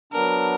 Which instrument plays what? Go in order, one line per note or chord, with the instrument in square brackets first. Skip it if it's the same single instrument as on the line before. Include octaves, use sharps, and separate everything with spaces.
[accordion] F#3 B3 D4 [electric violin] A#4